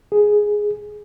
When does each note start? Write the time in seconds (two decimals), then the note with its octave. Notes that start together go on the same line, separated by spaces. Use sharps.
0.12 G#4